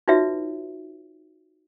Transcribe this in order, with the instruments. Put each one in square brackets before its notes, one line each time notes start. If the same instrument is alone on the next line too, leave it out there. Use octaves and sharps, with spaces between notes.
[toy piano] D#4 F4 F#4 B4 C#5 E5